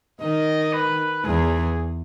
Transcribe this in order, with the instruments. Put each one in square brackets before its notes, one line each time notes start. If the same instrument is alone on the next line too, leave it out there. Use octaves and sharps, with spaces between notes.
[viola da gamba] D#3 [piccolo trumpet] D#5
[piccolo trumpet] B4
[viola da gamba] E2 [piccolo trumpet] G#4